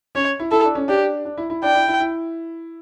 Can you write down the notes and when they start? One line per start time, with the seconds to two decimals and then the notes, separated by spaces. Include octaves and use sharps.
0.15 C#4 C#5
0.40 E4
0.51 E4 A4
0.64 D4
0.75 C#4
0.88 D4 G4
1.25 D4
1.38 E4
1.50 E4
1.63 D4 G5
1.74 E4
1.88 E4
2.00 E4